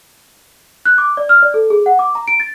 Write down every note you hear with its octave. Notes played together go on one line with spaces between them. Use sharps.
F#6
D6
D5
F6
D5
A4
G#4
F#5
D6
A#5
D7
A6